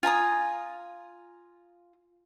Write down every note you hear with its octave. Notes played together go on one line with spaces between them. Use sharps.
F4 G#5 A#5 D#6